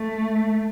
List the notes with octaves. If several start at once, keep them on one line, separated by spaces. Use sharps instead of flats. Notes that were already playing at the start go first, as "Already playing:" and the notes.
Already playing: A3